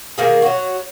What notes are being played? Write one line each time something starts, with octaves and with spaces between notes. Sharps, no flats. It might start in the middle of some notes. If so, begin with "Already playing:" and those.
D#3 A#3 G#4
F#3 F#4